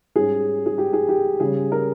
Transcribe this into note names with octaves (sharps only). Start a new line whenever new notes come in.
G#2 G3 C#4 G#4
G#4
G4
G#4
G4
C#3 G3 C#4 G#4
A#4